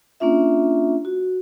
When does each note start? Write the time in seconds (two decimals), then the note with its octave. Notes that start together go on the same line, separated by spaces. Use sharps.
0.20 A#3 C#4 D4 F4 E5
1.05 F#4